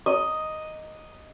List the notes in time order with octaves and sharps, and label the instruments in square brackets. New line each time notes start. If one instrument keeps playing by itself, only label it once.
[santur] D#5